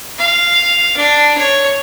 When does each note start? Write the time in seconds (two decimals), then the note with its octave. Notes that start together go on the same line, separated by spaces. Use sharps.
0.19 F5
0.97 D4
1.38 C#5